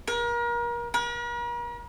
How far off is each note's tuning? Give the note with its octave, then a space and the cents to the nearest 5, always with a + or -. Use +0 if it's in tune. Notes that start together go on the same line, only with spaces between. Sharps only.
A#4 +35
A#4 +45